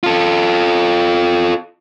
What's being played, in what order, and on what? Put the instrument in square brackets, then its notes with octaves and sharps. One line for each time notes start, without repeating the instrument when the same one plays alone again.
[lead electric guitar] F4 A4